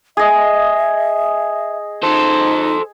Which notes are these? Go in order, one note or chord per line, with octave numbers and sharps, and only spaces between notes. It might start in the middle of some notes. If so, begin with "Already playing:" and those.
G#4 D#5 E5
D#4 A4 C5